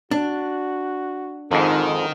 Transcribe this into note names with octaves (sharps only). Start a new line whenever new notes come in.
D4 F#4
F2 G#2 D#3 A4